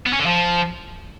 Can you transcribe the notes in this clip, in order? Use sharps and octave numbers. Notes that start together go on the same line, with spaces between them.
B3
C#4
D3
F3